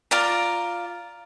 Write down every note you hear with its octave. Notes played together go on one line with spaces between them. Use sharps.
F4 D5 A#5